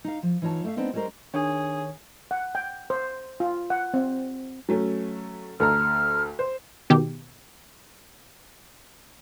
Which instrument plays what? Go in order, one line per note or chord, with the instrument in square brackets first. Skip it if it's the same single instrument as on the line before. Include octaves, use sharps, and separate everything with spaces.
[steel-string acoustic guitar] D#4 F5
F3
E3 D#4 F4 C#5 A5
A3 E5 F5
B3 C4 D4 D#4
G3 G#3 C#4 G#4 A#4 C5
[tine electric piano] D#3 C#5 [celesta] D4 [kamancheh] G#4
[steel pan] F#5
G5
C5
F4
F#5
C4
[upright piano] F#3 A3 C#4
[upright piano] D2 A4 A#5 [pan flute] F6
[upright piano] C5
[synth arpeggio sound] B2 D#3 G4